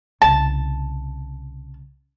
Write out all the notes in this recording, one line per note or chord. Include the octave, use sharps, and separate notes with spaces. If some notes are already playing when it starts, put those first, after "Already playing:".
C2 C#3 A5